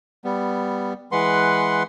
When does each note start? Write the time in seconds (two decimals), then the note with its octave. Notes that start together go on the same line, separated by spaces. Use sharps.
0.25 G3 B3
1.12 E3 G#3 B4 F#5 C6